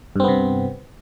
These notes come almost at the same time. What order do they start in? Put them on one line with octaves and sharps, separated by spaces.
G2 C4 B3 C3